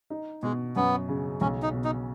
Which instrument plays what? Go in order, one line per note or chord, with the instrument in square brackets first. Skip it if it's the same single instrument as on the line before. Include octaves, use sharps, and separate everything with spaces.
[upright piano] D#4
[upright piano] B2 [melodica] G#3
[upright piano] F#2 [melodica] B3
[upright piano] C#3
[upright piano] B1 [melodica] C#4
[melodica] D#4
[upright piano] B2
[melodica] D#4